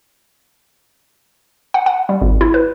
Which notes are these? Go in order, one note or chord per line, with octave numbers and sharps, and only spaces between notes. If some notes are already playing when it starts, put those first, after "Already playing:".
F#5
F#5
G3
G#1
E4
B4